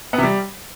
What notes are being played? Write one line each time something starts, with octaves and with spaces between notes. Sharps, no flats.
B3
C3
G3